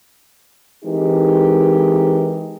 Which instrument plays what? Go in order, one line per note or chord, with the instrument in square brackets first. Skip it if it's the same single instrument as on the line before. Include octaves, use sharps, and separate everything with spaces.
[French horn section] E3 G#3 C4 D#4 G4 A#4